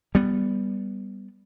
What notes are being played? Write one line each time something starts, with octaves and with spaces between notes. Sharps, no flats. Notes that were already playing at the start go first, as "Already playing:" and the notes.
G3 B3